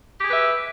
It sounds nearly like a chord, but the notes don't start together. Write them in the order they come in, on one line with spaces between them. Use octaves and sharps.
G4 G#4 B4 E5